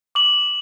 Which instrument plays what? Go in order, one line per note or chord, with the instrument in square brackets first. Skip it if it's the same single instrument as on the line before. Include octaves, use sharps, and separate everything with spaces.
[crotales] D6 F#7